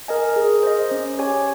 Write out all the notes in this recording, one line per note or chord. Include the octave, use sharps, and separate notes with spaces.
A#4 D#5 G#5
G#4
C5 D#5
C#4
G4 C#5 G#5